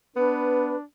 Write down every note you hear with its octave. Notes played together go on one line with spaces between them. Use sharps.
B3 D4 B4